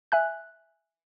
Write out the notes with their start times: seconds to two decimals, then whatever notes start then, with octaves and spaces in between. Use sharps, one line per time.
0.12 E5 G#5 F#6